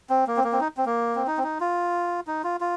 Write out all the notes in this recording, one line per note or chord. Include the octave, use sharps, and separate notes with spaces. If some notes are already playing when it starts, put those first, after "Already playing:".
C4
A#3
C4
A#3
C4
D#4
C4
A#3
C4
D#4
C4
D#4
F4
D#4
F4
F4